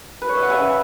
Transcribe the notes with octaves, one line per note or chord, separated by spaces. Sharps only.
B4
C#5
E5
F#5
C#3 E5 G#5